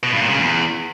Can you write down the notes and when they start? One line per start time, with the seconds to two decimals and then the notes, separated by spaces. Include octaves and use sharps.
0.03 B2
0.12 G2
0.21 A#2
0.29 C#3
0.38 E2